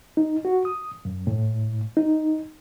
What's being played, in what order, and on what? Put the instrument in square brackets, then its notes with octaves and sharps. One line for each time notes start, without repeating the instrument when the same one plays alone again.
[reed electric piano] D#4
F#4
D#6
F#2
A2
D#4